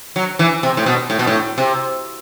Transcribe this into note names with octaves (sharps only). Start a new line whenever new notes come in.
F#3
E3
C3
A2
B2
A2
B2
A2
C3